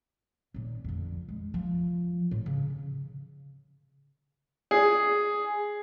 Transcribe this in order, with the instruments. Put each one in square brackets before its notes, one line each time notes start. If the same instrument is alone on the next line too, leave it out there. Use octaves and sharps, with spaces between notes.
[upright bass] D#2 A#2
F2 D3
G#3
F3
A2
C#3 C#4
[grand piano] G#4